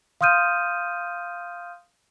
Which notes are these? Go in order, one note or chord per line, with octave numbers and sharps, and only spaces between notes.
F5 C6 D#6 F6 G6 D#7